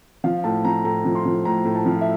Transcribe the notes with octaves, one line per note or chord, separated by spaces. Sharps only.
F3 F5
A2 A5
F3 A#5
A2 A#5
F3
C6
F3
A2 A#5
A2
A5
F3
E5